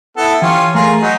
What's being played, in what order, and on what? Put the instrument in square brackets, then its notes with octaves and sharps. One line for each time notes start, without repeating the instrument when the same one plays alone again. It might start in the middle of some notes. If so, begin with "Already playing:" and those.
[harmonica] B3 E4 A4
[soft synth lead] E3 [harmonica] C#4 F4 G4
[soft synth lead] A3 [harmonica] F4 G#4 A#4
[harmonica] F#3 D#4